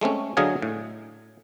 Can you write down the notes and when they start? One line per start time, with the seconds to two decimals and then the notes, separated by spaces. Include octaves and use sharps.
0.01 G#3 A3 C4 C#4
0.37 D3 F#3 G#4 D#5 F5 G#5
0.62 A2